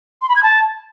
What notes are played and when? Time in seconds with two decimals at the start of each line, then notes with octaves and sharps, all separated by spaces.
0.22 C6
0.29 B5
0.36 G#6
0.43 A5